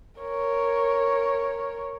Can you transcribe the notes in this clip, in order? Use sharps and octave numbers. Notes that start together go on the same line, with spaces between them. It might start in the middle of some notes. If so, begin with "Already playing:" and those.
A#4 C#5